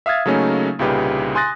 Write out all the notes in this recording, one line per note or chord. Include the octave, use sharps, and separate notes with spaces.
E5 F5 D#6 F6 G#6 A6
C#3 F#3 A3 A#3 C#4 D#4
C2 A#2 C#3 D#4 G4 B4
G#5 C6 D#6 F#6 A6 A#6